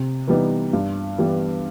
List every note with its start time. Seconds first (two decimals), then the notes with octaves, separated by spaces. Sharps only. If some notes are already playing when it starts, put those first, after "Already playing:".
Already playing: C3
0.28 E3 G3 B3 D#4
0.73 G2
1.18 E3 G3 B3